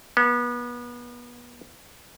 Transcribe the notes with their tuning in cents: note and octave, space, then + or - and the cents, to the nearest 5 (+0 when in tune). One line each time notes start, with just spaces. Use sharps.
B3 -30